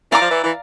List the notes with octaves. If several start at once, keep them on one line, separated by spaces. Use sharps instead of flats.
E3 D5 F5 A#5 D6
F3
E3
E3